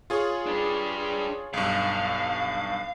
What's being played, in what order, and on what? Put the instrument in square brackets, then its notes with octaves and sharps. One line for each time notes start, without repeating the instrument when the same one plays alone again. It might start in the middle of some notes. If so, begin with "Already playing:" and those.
[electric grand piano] F4 G#4 C#5
[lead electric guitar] D4 B4
[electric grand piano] B1 G2 [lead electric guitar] F5